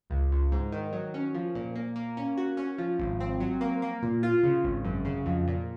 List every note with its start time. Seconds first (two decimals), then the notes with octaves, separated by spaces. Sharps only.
0.10 C#2
0.32 C#2
0.52 G#2
0.72 D#3
0.93 F#3
1.14 C#4
1.34 F3
1.55 A#2
1.75 A#3
1.96 A#3
2.17 C#4
2.37 F#4
2.57 C#4
2.78 F3
2.99 G#1
3.20 C4
3.40 F#3
3.61 A#3
3.82 A#3
4.02 A#2
4.23 F4
4.43 C#3
4.64 G#1
4.84 F#2
5.05 C#3
5.26 F2
5.47 A#2